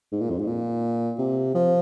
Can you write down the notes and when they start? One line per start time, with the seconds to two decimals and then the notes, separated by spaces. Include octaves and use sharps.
0.12 G#2
0.21 A#2
0.30 F2
0.39 G#2
0.47 A#2
1.19 C3
1.55 F3